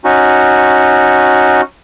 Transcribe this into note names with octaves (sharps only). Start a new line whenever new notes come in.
C#4 D#4 F#4